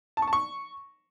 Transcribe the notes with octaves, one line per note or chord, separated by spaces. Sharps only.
A5
C#6
A5
C#6